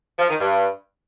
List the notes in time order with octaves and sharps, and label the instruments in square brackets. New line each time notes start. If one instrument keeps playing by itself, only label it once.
[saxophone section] F3
D#3
G2